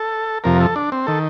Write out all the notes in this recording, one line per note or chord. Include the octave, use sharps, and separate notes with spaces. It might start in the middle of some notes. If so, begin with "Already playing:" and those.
Already playing: A4
F2 C3 F3 A#4
A4
D4
C4
D#3 A4